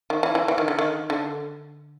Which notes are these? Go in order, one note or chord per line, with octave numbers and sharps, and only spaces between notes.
D#3
E3
E3
E3
D#3
D3
D#3
D3